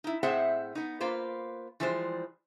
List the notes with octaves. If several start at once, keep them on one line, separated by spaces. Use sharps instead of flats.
D#4 E4
A2 C4 G#4 C5 E5 F#5
B3 D#4
A#3 F4 B4 C5
E3 F3 G3 G#3 C5